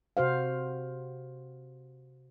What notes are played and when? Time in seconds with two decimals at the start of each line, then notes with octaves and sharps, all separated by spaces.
0.17 C3 F#4 C5 F5